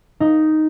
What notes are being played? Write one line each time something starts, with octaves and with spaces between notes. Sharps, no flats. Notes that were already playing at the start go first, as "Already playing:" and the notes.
D#4